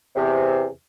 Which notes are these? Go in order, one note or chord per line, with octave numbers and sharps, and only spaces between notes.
E2 C3